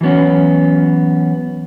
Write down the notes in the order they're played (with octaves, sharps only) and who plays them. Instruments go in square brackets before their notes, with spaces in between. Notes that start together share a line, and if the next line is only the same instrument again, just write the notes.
[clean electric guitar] E3 F#3 B3 C#4